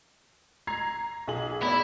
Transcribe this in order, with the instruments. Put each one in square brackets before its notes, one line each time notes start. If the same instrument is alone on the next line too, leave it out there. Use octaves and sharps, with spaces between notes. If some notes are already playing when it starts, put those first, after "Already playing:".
[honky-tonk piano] A#5 G#6 C7
B1 G#4 F#7
[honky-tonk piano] B3 D5 [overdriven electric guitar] E4